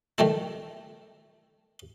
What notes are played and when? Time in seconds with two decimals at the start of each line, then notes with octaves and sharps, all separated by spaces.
0.18 D#3 G3 A3 E4